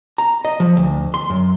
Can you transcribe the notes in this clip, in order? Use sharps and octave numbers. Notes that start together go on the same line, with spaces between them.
A#5
D#5
F3
D2
C6
F#2